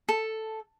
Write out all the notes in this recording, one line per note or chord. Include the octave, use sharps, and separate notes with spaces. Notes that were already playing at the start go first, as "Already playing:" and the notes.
A4